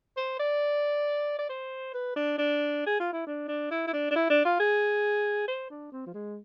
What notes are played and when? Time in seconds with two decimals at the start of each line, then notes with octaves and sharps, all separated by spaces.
0.17 C5
0.40 D5
1.39 D5
1.49 C5
1.94 B4
2.16 D4
2.38 D4
2.86 G#4
3.00 F4
3.13 E4
3.27 D4
3.48 D4
3.71 E4
3.87 E4
3.93 D4
4.11 D4
4.16 E4
4.30 D4
4.45 F4
4.59 G#4
5.48 C5
5.71 D4
5.92 C4
6.07 F3
6.14 G#3